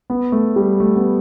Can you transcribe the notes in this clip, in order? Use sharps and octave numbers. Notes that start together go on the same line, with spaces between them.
B3
A3
G3
A3
B3